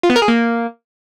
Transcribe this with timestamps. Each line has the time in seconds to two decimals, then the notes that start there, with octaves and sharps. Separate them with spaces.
0.03 F4
0.10 B3
0.16 A#4
0.22 G#4
0.28 A#3